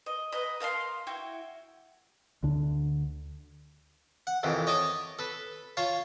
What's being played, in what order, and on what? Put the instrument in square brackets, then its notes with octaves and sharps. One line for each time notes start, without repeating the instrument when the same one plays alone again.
[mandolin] D#5
B4 D#5 F#5 A#5
A#4 F5 A5 C6
E4 F#4 G5
[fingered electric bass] D2 D3 D4
[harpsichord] F#5
F2 C3 D#3 E3
C#5 D#5 A5 D6 D#6
A4 B4
F4 C#5 F5 A5